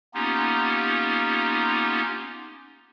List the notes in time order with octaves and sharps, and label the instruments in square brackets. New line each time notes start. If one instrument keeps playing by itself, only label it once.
[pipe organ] A#3 B3 C#4 D#4 F4 G4